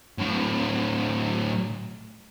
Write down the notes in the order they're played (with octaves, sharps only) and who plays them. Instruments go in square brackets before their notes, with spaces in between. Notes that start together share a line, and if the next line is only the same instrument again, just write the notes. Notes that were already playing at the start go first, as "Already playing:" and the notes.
[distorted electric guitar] A2 F#3